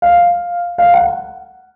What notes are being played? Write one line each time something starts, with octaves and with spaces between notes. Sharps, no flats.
F5
F5
F#5